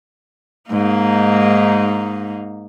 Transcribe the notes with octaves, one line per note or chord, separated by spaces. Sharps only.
G#2 A#3 D#4